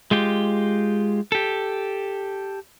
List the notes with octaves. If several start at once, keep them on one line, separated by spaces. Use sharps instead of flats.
G#3 F4 G4
G4 A4